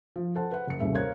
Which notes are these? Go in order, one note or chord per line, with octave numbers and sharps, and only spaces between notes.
F3
A4 C5 F#5 A5
B4 F#5
F#1 C#7
D#1 C2 C#3 E5
A#4 C5 C#5 F5 F#6 G#6